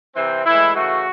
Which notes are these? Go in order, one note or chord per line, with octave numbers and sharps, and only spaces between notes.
C3 E3 C4
A2 E3 G#3 E4
C#3 E3 A3 F#4